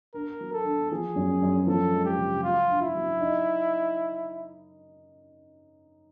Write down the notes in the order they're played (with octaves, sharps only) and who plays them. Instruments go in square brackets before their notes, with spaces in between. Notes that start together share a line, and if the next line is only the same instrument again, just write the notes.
[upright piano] D4 [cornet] A#4
[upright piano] F#3
[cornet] A4
[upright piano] D4
[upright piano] F3 [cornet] G#4
[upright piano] F#2
F#2
[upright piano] F3 [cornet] A4
[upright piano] G#3
[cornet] G4
[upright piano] C#3
[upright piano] F#3 [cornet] F4
[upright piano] D4
[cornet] E4
[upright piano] F#3
D#4